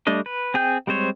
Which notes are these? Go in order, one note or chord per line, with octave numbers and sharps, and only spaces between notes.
G3 A3 D4 D#5
B4
C4 G#4 G5 G6
G3 G#3 C4 C5 C#5